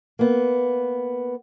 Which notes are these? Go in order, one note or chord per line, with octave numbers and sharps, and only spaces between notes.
A#3 B3